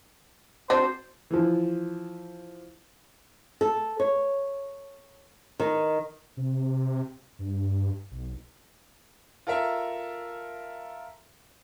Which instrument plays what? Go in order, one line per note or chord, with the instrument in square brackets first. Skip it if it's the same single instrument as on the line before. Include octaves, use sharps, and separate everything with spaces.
[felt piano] C4 F#4 [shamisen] D4 [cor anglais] C5
[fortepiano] E3 F3
[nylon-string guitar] A4
C#5
D#3
[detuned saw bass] C3
G2
B1
[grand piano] F4 A4 A#4 E5